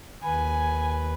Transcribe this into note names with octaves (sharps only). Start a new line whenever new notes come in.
D#2 B4 G#5